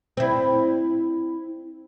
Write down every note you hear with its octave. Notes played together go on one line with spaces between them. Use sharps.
C4 E4